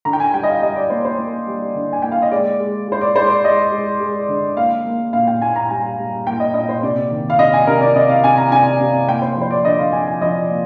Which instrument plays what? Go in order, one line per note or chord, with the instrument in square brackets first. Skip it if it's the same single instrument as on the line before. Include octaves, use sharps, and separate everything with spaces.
[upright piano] D3 A#5
G5
G#5
G3 G5
D#5
F5
G3 D#5
D5
A#3 C5
C5
A#3
G3
D3
G#5
A#3 G5
F5
D#5
G#3 D5
G#3
G#3 C5
D5
G#3 C5
D5
G#3 D#5
G#3
G#3
D3
A#3 F5
A#3
A#2 F5
G5
A#2 G#5
A#5
G3 G#5
G3
A#3 G5
D#5
A#2 D#5
C5
C3 D5
D#3
F5
C3 D#5
G#5
C3 A#4
D5
C3 D#5
F5
C3 G#5
A#5
C3 G#5
C3
A#3 G5
C5
F3 C5
D5
D3 D#5
F5
F3 G#5
G#5
F3 D#5
A#3